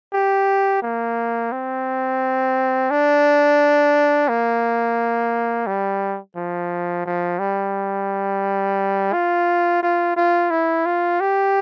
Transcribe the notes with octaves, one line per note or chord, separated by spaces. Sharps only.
G4
A#3
C4
D4
A#3
G3
F3
F3
G3
F4
F4
F4
E4
F4
G4